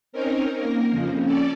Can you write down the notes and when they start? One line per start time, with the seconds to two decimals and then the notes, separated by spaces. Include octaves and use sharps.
0.12 C4 C#4 D#4 A#4
0.54 A#3 A#4
0.90 F2 C#3 F3
1.24 C#4 A4 D5